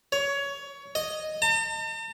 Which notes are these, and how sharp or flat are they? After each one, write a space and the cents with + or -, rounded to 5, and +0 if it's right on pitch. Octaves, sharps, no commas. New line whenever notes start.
C#5 +20
D#5 -5
A5 +45